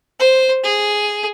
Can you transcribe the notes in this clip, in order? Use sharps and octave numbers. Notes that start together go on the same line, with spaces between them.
C5
G#4